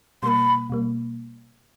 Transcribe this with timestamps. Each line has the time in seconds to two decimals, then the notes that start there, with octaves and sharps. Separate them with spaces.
0.23 B2 G3 A#3 B5 C6
0.70 B2 G3 A#3